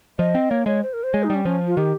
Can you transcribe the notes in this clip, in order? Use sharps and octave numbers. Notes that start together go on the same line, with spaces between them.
F3 D#5
C4
A#3 C#5
G#3 C#5
C5
A#4
C5
G#3 C#5
D#4
G3 C#4
F3 C#4
F4
D#3 G4